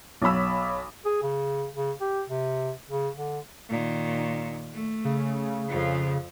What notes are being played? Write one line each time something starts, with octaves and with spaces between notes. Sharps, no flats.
B1 F#3 C#5 B5 E6
G#4
C#3
C#3
G4
C3
C#3
D3
A#2 D#3
A3
C#3
F2 F3